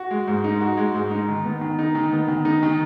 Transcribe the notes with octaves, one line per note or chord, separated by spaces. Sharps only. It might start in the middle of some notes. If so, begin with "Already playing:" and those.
Already playing: F#4
G#3
G#2
D#4
F#4
G#3
G#2
D#4
D#3
B3
D#3
D#4
D#3
B3
D#3
D#4
D#3